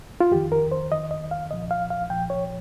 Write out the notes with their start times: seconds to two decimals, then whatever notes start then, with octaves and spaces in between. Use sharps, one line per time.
0.21 F4
0.31 F2 D#3 G4
0.52 A#4
0.72 C5
0.91 F2 D#3 D#5
1.11 D#5
1.31 F5
1.51 C2 A#2 F3 D#5
1.71 F5
1.90 F5
2.10 C2 A#2 F3 G5
2.30 C#5